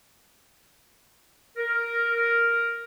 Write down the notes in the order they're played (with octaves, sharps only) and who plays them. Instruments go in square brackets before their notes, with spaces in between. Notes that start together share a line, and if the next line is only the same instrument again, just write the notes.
[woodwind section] A#4